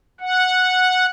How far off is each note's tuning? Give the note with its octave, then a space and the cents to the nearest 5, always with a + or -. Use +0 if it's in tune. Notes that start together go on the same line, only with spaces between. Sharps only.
F#5 -10